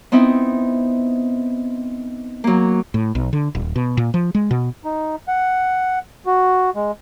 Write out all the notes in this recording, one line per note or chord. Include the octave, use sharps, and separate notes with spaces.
B3 C4 D#4 E4
F#3 A#3
A2
B1
D3
D#1
B2
A#2
F3
G#3
B2
D#4
F#5
F#4
G#3